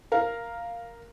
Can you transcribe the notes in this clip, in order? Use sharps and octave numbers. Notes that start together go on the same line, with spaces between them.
A#4 F5